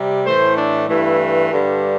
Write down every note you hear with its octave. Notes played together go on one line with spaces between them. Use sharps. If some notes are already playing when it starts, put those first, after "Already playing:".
Already playing: C3 G3
A2 E3 A3 C5
D4
G2 E3 A3 E4
G2 D3 G3